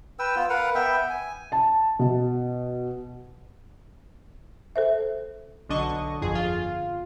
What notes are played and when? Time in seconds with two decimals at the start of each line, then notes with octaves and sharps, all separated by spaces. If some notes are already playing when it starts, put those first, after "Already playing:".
0.19 B4 G5 E6
0.36 B3 F4
0.50 A#4 B4 F5 F#5
0.75 B3 E5 G5
1.10 G#5
1.52 A5
1.99 B2
4.76 A4 C5 E5
5.69 B1 D3 D4 D#5 C#6
6.21 G1 F2 G#4
6.33 G1 F4